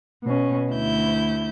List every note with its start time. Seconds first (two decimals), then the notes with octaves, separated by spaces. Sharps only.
0.24 B2 C#4
0.71 D2 E4 G6